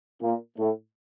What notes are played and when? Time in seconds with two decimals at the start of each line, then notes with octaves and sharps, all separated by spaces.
0.21 A#2 A#3
0.58 A2 A3